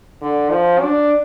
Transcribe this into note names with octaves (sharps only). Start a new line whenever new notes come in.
D3
F3
D4